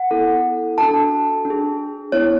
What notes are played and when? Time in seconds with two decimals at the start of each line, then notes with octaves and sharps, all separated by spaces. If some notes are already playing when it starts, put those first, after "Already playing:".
Already playing: F#5
0.11 B3 E4 A4
0.78 D4 F#4 A4 A5
1.45 D4
1.50 G#4
2.12 B3 E4 G#4 C#5